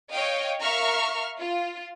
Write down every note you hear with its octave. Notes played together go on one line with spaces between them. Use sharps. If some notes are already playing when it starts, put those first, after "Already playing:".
C#5 D#5 F5 G5
A#4 E5 F5 A#5 C#6 F6
F4